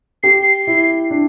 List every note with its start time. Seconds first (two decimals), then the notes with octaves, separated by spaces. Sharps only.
0.23 G4 C7
0.43 C7
0.67 E4
1.10 D4